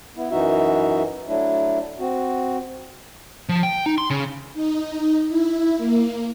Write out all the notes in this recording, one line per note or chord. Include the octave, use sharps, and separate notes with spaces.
B3 E4
F#2 E3 D#4 F#4 E5
F#3 A3 D4 E4
C4 F#4
F3
G5
D#4
C6
C#3
D#4
E4
A#3